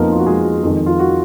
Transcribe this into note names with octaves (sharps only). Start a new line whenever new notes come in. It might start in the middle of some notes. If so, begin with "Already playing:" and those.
Already playing: F2 F3 A#3 B3 D#4 A#4
F4
F#4
G#3 G#4
F2 D#3 G#3
F4
F#4